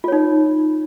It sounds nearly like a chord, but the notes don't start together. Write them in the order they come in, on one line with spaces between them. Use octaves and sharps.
F4 C#5 D#4